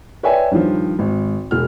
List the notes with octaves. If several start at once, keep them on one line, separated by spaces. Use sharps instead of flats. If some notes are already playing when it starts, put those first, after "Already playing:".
B4 C#5 D5 E5 G5 G#5
G2 D#3 F3
G#1
E1 F6